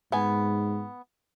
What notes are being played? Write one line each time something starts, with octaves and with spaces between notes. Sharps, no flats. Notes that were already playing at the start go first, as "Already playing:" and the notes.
G#2 B3 G#5